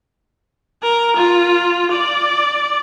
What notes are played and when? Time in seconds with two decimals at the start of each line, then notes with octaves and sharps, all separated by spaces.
0.83 A#4
1.16 F4
1.91 D5